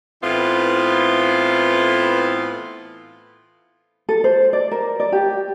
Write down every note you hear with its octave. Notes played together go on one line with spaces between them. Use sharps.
A2 E3 B3 C4 F4
A4
C5
D5
A#4
D5
G4